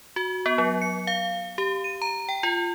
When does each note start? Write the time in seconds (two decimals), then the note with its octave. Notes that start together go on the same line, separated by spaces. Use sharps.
0.16 F#4
0.46 B3
0.58 F#3
0.82 C#7
1.07 F5
1.58 G4
1.84 D#7
2.02 A#5
2.29 G5
2.43 F4